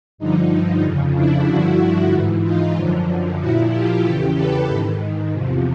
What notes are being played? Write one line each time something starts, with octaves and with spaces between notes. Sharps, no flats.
G2 D3 F3 D#4
F2 C#3 F3
D4 E4
G2 D3 F3 E4 F#4
G#2 E3
D#4 F4
F#2 D3 F3
A#2 F3 E4 F#4
F4 G4
E2 C#3 E3 G4 A4
A4 B4
G#2 D#3
E2 C3 F3